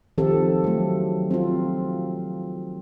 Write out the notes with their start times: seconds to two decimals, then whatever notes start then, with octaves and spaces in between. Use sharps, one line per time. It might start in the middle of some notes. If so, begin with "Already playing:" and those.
0.18 D#3 F3 C4 G4 A4
0.64 F#3 A3
1.31 C4 F4